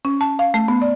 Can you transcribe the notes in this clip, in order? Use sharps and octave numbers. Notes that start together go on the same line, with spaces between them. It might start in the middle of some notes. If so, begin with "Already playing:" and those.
C#4
A5
F5
A3
B3
D5